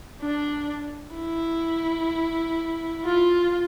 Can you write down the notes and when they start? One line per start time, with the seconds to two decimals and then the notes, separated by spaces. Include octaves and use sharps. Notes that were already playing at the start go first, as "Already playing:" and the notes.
0.21 D4
1.16 E4
3.05 F4